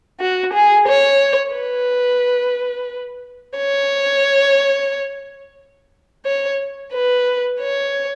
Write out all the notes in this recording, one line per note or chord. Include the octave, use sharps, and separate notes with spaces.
F#4
G#4
C#5
B4
C#5
C#5
B4
C#5